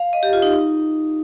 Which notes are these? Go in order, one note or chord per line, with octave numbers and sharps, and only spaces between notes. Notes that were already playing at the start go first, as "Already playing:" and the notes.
Already playing: F5
D#5
G4
F4
D#4
D#4